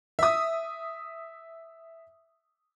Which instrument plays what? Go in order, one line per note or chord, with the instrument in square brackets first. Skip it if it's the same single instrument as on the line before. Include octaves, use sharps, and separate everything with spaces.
[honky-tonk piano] E5 D#6